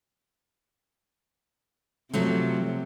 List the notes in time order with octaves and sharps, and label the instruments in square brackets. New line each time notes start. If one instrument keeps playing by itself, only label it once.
[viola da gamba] C3 [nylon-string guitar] F3 F#3 A3